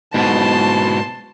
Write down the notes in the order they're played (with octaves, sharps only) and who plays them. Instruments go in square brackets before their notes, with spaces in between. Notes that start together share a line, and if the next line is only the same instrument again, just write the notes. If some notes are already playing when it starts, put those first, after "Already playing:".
[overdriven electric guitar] G#2 B2 [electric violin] A5 C6